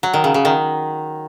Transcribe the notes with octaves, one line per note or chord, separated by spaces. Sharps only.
F#3
D#3
C#3
C#3
D#3